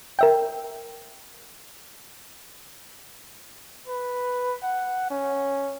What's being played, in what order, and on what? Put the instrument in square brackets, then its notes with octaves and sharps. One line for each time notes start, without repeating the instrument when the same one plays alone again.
[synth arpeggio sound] A#4 E5 G5
[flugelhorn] B4
F#5
C#4